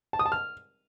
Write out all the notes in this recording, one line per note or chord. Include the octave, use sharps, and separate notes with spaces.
A5
D#6
A5
F6